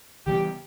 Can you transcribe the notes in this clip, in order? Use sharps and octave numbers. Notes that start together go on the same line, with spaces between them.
C#3 E3 G3 B3 G4